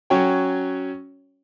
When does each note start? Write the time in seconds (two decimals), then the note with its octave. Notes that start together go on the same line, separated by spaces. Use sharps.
0.10 F#3 C#4 F#4 C#5 G5